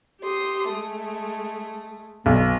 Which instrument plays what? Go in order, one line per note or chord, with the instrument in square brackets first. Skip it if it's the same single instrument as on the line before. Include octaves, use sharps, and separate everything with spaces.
[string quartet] G4 C6 D#6
G#3 A3
[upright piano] B1 [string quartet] B2